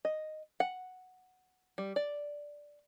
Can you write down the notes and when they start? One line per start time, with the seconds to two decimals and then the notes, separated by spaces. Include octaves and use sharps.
0.05 D#5
0.60 F#5
1.78 G3
1.96 D5